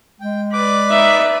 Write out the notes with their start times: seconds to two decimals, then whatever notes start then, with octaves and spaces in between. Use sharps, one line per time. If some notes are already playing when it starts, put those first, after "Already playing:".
0.21 G#3 G5
0.53 B4 D5 D6
0.90 D#4 E5